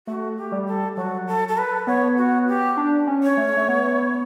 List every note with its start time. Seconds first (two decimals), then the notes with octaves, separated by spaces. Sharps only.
0.07 A3 F#4
0.37 G4
0.52 G3
0.67 A4
0.97 F#3 F#4
1.27 A4
1.48 A4
1.58 B4
1.87 B3 C#5
2.17 F#4
2.48 G4
2.77 D4
3.07 C#4
3.23 C#5
3.37 A3
3.57 A3
3.68 B3